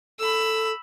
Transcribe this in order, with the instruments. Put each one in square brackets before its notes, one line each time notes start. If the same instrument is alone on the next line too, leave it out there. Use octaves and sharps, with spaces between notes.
[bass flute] A4 [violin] B5 E6